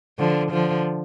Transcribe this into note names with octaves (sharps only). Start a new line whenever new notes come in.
D3 F3
D3 F3